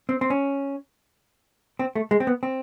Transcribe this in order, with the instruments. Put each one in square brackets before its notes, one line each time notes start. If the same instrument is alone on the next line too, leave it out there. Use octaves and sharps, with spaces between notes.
[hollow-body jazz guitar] C4
C4
C#4
C4
A3
G#3
C4
B3
C4